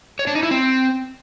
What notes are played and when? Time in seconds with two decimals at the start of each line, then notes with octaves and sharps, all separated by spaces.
0.19 C#5
0.27 D4
0.35 D#4
0.43 E4
0.51 C4